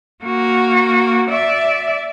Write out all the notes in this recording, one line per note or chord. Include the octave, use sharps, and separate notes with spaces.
A#3 F#4
D5 E5